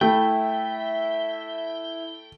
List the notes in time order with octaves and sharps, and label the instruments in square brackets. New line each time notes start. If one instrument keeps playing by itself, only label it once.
[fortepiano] A3 [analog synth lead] E4 [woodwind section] E5 [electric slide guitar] G5